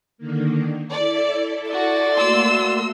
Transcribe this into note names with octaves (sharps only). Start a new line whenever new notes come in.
D3 D#3 A#3
E4 A4 D5
F#4 D5
A3 A#3 F#4 C6 E6